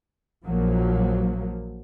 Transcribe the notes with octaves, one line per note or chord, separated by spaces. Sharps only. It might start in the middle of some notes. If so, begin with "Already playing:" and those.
A#1 F3 F#3 A#3